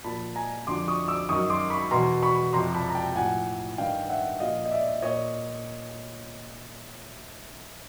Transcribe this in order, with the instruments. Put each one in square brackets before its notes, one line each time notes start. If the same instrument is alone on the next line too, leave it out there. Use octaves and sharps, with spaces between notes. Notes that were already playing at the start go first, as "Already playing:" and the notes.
[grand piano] A#2 F3 A5 B5
G#5 A#5
F2 D3 F3 C6 D6
C#6 D#6
D6 E6
F#2 D#3 C#6 D#6
C6 D6
B5 C#6
E2 B2 A#5 C6
B5 C#6
F2 C3 F3 A#5 C6
A5 B5
A#5
G5 A5
A2 F3 F#5 G#5
G2 D#3 F5 G5
E5 F#5
A#2 F3 D#5 F5
D#5
D5 E5
A#2 C#5 D#5